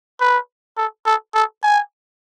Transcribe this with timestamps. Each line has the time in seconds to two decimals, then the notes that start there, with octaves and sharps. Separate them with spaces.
0.21 B4
0.77 A4
1.06 A4
1.35 A4
1.63 G#5